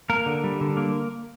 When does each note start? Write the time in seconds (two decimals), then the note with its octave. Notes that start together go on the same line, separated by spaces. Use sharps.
0.10 A#3 A#4
0.26 D3
0.44 G3
0.61 D3
0.77 A#3